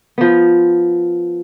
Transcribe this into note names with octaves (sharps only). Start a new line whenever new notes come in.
F3 B3